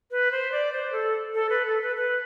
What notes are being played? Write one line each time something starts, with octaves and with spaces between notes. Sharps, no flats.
B4
C5
D5
C5
A4
A4
B4
A4
B4
B4